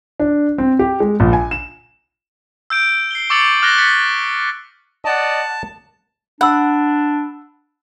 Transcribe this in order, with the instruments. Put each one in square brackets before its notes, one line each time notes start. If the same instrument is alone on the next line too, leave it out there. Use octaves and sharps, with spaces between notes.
[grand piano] D4
C4
G4
G#3
A#1
G#5
E7
[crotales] E6 G6 D7
C7 G7
C#6 D6 E6 A6 C#7 F#7
D6 F6 F#6 A6 A#6 G7
A6 B6 C#7 G7
[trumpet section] D5 D#5 F#5 [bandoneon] A5
[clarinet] D4 [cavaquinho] F#5 [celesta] B5 E6